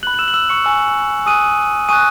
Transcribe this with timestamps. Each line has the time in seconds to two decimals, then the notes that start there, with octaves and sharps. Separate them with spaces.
0.03 F#6 F#7
0.07 B5
0.14 F#7
0.19 E6 E7
0.28 F#7
0.34 E6 E7
0.49 C#6 C#7
0.65 G#5 C#6 E6
1.26 G#5 D#6 F#6 D#7
1.89 G#5 C#6 D#6 F#6 D#7